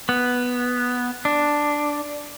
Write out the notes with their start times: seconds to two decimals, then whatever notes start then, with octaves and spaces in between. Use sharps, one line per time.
0.09 B3
1.25 D4